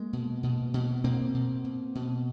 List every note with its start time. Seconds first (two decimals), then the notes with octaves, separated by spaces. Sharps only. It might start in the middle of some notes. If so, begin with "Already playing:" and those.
Already playing: G#3 A#3
0.13 B2
0.43 B2
0.74 B2
1.04 B2 A#3 C4
1.34 B2
1.64 B2
1.95 B2